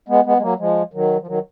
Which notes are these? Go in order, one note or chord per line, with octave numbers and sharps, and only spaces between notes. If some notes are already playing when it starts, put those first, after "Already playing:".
G#3 B3
G#3 B3
G#3
F#3 A#3
F3 G#3
D#3 F#3
F3
D#3 F#3